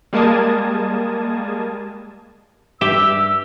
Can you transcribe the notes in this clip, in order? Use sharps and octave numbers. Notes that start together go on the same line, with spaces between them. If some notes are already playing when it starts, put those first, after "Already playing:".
G3 G#3 A#3 A5 D#6 G#6
G2 G4 E5 E6